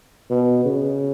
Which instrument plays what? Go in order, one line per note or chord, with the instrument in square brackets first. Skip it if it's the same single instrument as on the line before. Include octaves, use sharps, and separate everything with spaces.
[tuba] B2
C#3